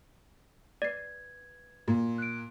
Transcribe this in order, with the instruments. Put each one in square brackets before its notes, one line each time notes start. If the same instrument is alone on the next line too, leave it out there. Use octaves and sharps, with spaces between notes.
[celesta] B4 G#6 [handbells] D5 C7
[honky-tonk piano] A#2
[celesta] F#6 D7